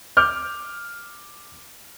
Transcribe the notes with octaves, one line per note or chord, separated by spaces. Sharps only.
D6 F6 G6